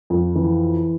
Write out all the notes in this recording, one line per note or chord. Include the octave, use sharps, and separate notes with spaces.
F2
E3